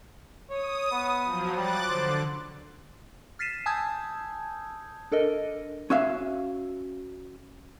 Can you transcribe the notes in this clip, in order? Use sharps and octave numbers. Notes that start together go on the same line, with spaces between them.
C#5 D#6
B3
F3 F#3
G3 D6 F#6 A6
D3 C5
F6 A6 B6 C7 D#7 E7
G#5 A5 D#6 E6 G6 G#6
D4 A4 A#4 D#5
C#4 F#4 E5 F5